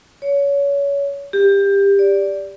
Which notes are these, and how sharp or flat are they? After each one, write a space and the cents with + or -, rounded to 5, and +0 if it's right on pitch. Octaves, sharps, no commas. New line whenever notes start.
C#5 +25
G4 +20
D5 -10